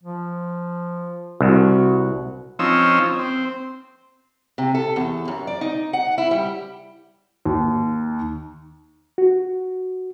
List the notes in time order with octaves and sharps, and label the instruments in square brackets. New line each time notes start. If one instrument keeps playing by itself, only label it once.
[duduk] F3
[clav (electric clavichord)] C2 [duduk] F#4
[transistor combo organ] F3 C4 C#4 D#4 E6
C4
[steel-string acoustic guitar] C3
A4
E2
F#2
D5
D#4
F#5
E4
G3
[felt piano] D#2
[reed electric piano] F#4